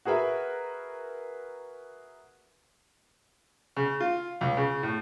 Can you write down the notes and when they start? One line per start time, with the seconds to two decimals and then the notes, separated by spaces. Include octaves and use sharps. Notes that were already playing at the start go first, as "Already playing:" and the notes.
0.05 F#4 G#4 A#4 B4 E5
3.77 C#3
4.00 F4
4.41 C#2
4.57 C#3
4.83 A2